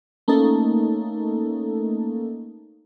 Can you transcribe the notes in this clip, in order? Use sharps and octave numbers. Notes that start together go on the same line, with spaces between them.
A3 A#3 C#4 D#4 A4